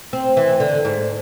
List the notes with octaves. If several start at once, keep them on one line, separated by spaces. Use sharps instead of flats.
C4
E3
D3
G#2